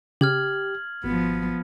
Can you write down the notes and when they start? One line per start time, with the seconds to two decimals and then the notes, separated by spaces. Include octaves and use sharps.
0.21 C#3 G4 F6 G#6 F#7
1.04 G#1 F3 B3